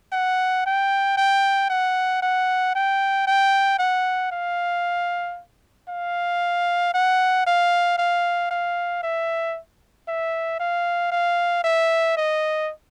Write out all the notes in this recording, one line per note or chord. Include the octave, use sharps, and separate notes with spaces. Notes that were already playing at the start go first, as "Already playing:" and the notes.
F#5
G5
G5
F#5
F#5
G5
G5
F#5
F5
F5
F#5
F5
F5
F5
E5
E5
F5
F5
E5
D#5